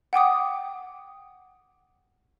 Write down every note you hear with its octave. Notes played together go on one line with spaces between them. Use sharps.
F#5 G5 D6 D#6